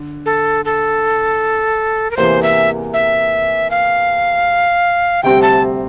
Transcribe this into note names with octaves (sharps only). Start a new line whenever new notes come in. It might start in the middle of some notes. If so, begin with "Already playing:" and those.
Already playing: D3
A4
A4
A#4
E2 C3 E3 A#3 C5
E5
E5
F5
D2 C3 G3 C4 G4 G5
A5